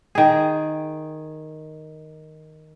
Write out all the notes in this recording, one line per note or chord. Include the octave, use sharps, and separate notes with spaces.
D#3 G#4